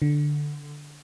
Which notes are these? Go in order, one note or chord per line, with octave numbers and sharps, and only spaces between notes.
D3